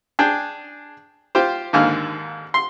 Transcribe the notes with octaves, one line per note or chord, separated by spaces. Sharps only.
D4 G#4 G5
F4 G4 C5
D#2 G#2 D3 A#3 G#5 F6
C6